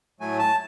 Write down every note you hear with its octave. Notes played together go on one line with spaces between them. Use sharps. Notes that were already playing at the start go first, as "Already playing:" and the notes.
A2 F#3 A3 G#5
A5